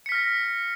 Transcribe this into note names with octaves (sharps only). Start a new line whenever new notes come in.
F6 A#6 B6 C#7